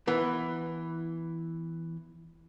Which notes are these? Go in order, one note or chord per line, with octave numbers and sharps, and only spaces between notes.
E3 B3